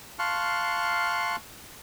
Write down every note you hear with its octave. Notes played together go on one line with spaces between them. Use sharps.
F5 A5 C6 C#6 F6 F#6